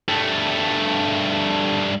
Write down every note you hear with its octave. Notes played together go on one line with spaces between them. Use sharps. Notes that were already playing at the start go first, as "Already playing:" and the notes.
G2 A3